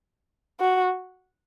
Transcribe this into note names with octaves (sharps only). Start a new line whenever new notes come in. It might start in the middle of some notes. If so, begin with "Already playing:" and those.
F#4